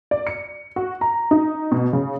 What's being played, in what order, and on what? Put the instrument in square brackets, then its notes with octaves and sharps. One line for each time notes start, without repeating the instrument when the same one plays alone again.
[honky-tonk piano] D5
C#7
F#4
A#5
D#4
B2
C#3